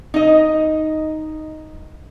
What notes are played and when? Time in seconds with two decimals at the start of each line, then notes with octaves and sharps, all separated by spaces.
0.14 D#4 D#5